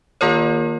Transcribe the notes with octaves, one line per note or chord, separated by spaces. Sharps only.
D#3 A#3 F4 A#4 C#5